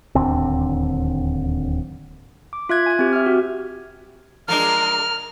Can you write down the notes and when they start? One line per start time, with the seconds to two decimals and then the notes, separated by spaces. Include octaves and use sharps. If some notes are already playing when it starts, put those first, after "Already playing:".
0.15 D1 D#2 D3 C4
2.53 D6
2.69 F4 E5 F#6 G#6
2.86 G#5 G#6
2.99 C4 G4
3.13 E5 F6
3.26 F#4
4.48 F3 G#3 D4 A#4 F6